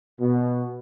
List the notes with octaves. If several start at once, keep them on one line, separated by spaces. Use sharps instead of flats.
B2